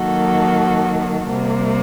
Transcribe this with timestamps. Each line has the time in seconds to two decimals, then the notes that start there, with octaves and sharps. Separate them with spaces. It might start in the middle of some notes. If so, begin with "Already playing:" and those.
Already playing: D#3 F#3 A#3 F#4 A4
1.26 C3 G3 A#3